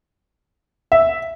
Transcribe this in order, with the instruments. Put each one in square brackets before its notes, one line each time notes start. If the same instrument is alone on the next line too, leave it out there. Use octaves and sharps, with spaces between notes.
[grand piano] E5